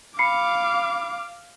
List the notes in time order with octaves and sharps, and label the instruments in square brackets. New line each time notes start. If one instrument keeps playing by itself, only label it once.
[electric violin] F5 D6 [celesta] B5 C7 C#7